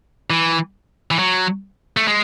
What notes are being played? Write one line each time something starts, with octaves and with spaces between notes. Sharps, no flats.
E3
E3
F#3
A3
G#3